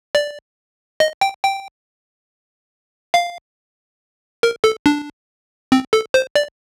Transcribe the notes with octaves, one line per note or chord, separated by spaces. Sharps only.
D5
D#5
G5
G5
F5
A#4
A4
D4
C4
A4
C5
D5